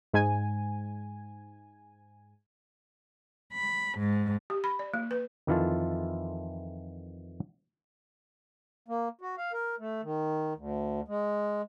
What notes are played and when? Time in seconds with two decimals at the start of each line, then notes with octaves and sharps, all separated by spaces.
0.13 G#2 G#5
3.54 B5
3.99 G#2
4.50 G4
4.64 B5
4.79 D5
4.94 A#3
5.11 B4
5.47 F2 D#3 E3 E4 F4 A4
8.88 A#3
9.21 F#4
9.38 F5
9.53 A#4
9.79 A3
10.03 D#3
10.57 D2
11.08 G#3